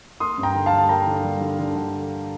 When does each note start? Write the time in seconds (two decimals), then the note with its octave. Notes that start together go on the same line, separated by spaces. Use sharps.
0.20 A#3 C6 D#6
0.38 G2
0.43 G5 A#5
0.55 D3
0.66 F5 A5
0.72 G3
0.78 A5
0.89 A#3 G5 A#5
1.07 D3
1.24 G3
1.41 D3
1.59 D3
1.76 D3